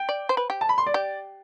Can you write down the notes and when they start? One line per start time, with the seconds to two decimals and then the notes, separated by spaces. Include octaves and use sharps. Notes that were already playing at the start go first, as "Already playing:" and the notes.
Already playing: G5
0.09 D5
0.29 C5
0.37 B4
0.50 G4
0.61 A5
0.69 B5
0.78 C6
0.86 D5
0.94 G4